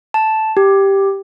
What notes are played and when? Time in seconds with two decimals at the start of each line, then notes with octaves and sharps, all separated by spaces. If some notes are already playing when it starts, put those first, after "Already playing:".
0.14 A5
0.57 G4